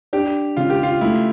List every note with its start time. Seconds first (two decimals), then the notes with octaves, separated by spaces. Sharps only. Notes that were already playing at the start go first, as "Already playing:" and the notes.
0.13 D4 G4
0.57 C#3 F4
0.70 G4
0.83 F4
1.01 A3 E4